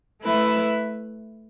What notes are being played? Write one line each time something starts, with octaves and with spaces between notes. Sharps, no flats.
A3 E4 B4